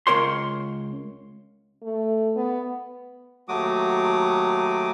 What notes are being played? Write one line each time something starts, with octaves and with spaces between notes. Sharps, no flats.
C#2 A#4 C#5 C6
A3
B3
D#2 F#3 A3 F#4 D6 D#6